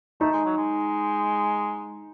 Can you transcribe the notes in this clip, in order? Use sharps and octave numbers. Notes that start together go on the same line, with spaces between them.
A3 D#4
G#3
F#3
G#3